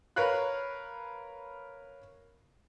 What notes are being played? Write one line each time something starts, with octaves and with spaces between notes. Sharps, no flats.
A#4 B4 C#5 F5 B5 F#6